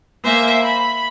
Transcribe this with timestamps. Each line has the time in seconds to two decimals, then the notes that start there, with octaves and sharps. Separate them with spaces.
0.22 A#3 C5 E5 G#5
0.62 B5